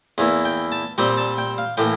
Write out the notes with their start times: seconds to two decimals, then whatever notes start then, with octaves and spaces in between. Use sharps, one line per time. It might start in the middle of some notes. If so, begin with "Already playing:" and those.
0.18 E2 E3 A#3
0.45 G5
0.72 A5
0.98 A#2 G3 C4 G5
1.17 A5
1.38 G5
1.58 F5
1.77 A2 E3 A#3 G5